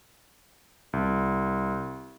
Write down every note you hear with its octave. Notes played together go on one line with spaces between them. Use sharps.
C2